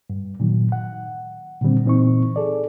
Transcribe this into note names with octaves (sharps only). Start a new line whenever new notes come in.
G2
A#2 D#3 F#3
F#5
A#2 D3 D#3 G3 C4
A#2 E3 C4 D#4 C#6
G#4 A4 D5